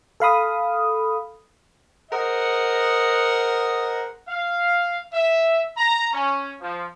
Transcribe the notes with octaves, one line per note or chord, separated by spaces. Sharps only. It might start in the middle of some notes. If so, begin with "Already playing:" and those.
A4 F5 B5 D#6
G#4 A#4 C5 D#5 F#5
F5
E5
A#5
C#4
F3